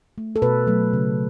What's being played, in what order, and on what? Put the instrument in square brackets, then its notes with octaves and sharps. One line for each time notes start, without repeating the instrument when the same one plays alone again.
[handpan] A3
A4
B2 B4
F#3 A3
C#3